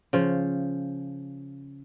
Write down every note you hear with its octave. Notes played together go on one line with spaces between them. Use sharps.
C#3 F3